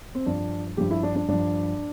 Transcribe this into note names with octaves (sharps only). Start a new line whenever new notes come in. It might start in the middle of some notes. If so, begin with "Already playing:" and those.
C4
G2 F3 D4
G2 F3 G4
E4
D4
D4
G2 F3 D4